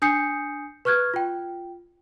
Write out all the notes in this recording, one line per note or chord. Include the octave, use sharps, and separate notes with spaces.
D4 G#5 D#6 G6 C7 C#7
B4 C#6 F6 F#6 G#6
F4 G5